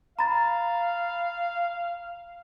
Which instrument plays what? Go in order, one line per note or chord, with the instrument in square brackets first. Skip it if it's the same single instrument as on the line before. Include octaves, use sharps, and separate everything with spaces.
[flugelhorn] F5 [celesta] A#5 B5 A6